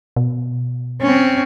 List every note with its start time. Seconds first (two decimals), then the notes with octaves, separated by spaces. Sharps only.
0.16 B2
1.01 C4 C#4